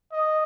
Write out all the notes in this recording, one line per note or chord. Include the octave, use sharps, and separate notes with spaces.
D#5